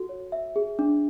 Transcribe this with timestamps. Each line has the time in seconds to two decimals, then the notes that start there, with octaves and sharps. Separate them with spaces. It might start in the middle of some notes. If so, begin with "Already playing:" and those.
Already playing: F#4 A4
0.09 C#5
0.32 E5
0.56 G#4
0.79 D4